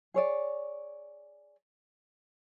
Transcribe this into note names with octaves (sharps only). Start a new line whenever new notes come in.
G#4 C#5 D5